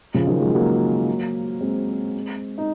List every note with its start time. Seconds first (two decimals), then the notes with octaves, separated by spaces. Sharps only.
0.14 C#3 F3
0.27 D#3 F#3
0.41 F3 G#3
0.54 F#3 A#3
1.61 G#3 C4
2.58 D#4